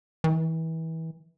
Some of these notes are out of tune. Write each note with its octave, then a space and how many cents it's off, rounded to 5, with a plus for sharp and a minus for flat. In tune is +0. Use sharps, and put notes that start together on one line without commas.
E3 -30